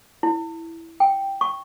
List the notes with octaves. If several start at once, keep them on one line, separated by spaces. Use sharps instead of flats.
E4
G5
C#6